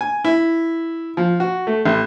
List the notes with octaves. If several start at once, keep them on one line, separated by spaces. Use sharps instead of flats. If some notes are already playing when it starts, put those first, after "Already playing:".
G#5
E4
F3
F#4
A3
A1